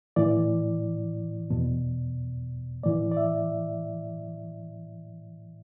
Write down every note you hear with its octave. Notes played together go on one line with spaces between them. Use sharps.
A2 E3 D5
E2 B2
A2 E3 D5
D5
E5